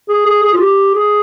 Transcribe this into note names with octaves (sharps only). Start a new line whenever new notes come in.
G#4
G#4
G#4
F4
G4
G#4